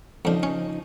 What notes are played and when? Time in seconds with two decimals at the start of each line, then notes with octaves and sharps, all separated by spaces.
0.25 F2 C#3 F3 D4 D#4
0.43 C#4